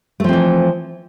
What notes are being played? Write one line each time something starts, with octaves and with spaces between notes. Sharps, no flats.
E3 F3 A3 C4